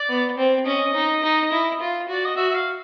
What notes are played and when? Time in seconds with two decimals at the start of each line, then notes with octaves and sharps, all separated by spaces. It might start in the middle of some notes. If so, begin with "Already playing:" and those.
Already playing: D5
0.09 B3
0.38 C4
0.66 C#4 D#5
0.94 D#4
1.23 D#4
1.52 E4
1.80 F4
2.08 F#4 D5
2.25 D#5
2.36 F#4 E5
2.50 E5
2.56 F5